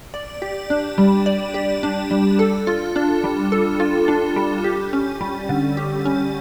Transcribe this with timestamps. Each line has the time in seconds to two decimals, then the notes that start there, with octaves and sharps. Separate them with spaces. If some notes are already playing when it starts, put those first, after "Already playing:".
0.14 D5
0.42 G4
0.70 D4
0.98 G3
1.26 D5
1.54 G4
1.83 D4
2.11 G3
2.39 A4
2.67 F4
2.96 D4
3.24 G3
3.52 A4
3.80 F4
4.08 D4
4.36 G3
4.64 G4
4.93 C#4
5.21 G3
5.49 D3
5.77 G4
6.06 C#4